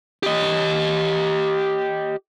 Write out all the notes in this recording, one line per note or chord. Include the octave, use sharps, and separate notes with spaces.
G4 D#5